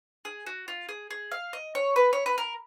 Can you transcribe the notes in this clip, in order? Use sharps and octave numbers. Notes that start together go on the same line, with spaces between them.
G#4
F#4
F4
G#4
G#4
F5
D#5
C#5
B4
C#5
B4
A#4